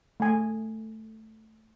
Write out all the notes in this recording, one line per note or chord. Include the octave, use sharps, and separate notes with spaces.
A3 G#5